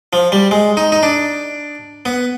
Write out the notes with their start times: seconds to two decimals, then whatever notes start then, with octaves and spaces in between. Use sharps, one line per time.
0.13 F3
0.32 G3
0.51 G#3
0.77 D#4
0.92 D#4
1.03 D4
2.05 B3